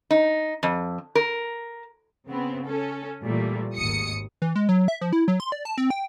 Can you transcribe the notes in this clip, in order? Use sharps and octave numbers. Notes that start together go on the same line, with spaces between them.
D#4
F2
A#4
C#3 B3 C4
C#4 A4
A#2 E3 G3 A3
G#1 D#2 D#6 C#7
E3
G#3
F#3
E5
F3
E4
F#3
C6
D5
A5
C4
G5